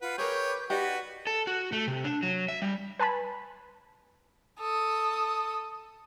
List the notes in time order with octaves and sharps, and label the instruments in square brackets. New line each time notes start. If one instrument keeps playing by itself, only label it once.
[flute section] F4 F#5 [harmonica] B4
[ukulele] G#4 A#4 [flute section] B4 D6 G6 [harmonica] C#5 G5
[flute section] D#4 D5 [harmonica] F#4 B4 [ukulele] G4 F#5
[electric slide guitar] A4
F#4
A3
C3
D4
F#3
E5
G3
[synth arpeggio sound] B4 G#5 A5 B5
[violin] A4 D#6